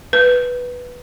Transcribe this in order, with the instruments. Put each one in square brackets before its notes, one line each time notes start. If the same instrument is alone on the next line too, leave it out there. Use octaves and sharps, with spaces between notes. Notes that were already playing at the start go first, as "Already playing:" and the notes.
[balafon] B4